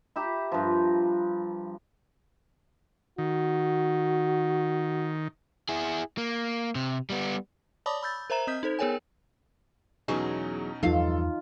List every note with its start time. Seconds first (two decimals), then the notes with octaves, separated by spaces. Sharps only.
0.16 G4 E5 A#5 B5
0.52 G2 F3
3.18 D#3 F#4
5.69 E4 G#4
6.18 A#3
6.75 C3
7.10 G3 B3
7.86 C#5 D5 A5 B5 D6 D#6
8.03 B5 E6 G6 A6
8.30 A#4 C5 E5 A#5 E7
8.47 C4 D#5 D#6 G6 B6
8.63 D#4 A4 C5
8.79 B3 G#4 A#4 C#5 G5 G#5
10.08 E2 B2 F#3 C#4 D#4 G#4
10.83 E2 G2 F3 D#4 F4 A4 F5